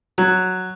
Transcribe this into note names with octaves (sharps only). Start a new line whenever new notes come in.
F#3